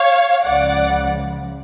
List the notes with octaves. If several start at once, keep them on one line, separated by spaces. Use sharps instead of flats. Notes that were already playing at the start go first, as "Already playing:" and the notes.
Already playing: C#5 F5
C#2 C#3 F3 D5 F#5